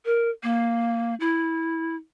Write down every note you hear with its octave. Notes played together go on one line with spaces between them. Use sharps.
A#4
A#3
E4